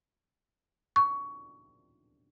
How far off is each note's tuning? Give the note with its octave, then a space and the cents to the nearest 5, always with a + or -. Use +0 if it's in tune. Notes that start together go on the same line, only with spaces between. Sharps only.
C#6 +15